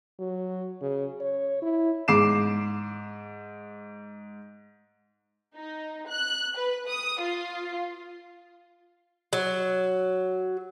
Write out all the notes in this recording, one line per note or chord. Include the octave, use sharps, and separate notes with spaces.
F#3
C#3
C#5
E4
G#2 D6 C7 E7
D#4
F#6
B4
D#6
F4
F#3